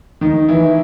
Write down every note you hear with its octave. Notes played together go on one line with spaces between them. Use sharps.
D#3 D#4
E3 E4